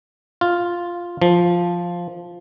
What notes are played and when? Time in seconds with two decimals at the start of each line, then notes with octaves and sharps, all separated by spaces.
0.41 F4
1.22 F3